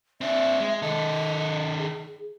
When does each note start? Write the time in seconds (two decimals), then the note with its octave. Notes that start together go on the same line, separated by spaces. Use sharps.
0.21 C4 D4 E5
0.60 G#3
0.82 D#3 A4 D#5
1.78 G#4